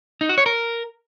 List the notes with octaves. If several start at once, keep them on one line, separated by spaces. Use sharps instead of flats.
D#4
F#4
C#5
A#4